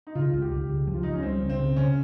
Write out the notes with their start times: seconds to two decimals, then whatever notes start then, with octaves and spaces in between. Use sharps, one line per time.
0.07 D#4
0.15 C#3 F4
0.33 C#2
0.42 G4
0.51 C#2
0.70 C#3
0.87 F3
0.94 F4
1.03 C#2 D#4
1.13 C#4
1.23 G3 C4
1.41 C#2
1.50 C4
1.59 C#3
1.76 C#3 C#4